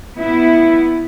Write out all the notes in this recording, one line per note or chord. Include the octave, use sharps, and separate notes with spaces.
B3 E4